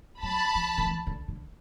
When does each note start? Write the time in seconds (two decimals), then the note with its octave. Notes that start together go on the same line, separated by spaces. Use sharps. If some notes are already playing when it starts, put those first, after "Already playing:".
0.23 F#3 A5 B5
0.55 F3
0.78 D#3
0.86 E3
1.07 D3
1.28 D3